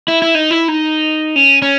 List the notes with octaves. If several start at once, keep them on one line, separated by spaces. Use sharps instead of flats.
E4
E4
D#4
E4
D#4
C#4
C#4